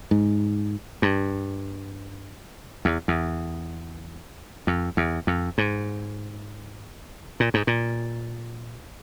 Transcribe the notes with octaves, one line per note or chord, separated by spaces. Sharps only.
G#2
G2
E2
E2
F2
E2
F2
G#2
A#2
G#2
A#2